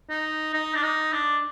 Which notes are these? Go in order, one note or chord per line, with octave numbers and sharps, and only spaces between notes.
D#4
D#4
D4
D#4
D4